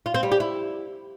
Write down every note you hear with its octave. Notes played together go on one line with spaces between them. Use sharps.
F4
C4
G3
G4
E4